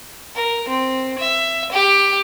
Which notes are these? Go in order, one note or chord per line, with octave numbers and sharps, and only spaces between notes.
A#4
C4
E5
G4